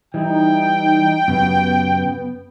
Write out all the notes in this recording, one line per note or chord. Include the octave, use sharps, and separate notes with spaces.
E3 G3 D#4 E4 G5
F#2 C#3 B3 G4